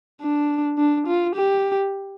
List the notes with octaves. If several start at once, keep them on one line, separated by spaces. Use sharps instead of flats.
D4
D4
F4
G4